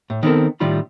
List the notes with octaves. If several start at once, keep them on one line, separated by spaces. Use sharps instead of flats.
A2
D#3 B3 C4 A4 A#4
A2 D#3 G3 F4 B5